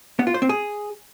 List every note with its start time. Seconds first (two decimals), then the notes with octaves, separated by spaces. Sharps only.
0.19 B3
0.27 F4
0.34 C5
0.42 C4
0.49 G#4